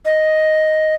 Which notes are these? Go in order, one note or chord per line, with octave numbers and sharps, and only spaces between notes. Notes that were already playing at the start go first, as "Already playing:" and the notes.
D#5